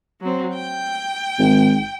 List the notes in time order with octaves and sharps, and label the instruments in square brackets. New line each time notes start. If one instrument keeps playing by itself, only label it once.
[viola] F#3 C4
G5
[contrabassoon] G#1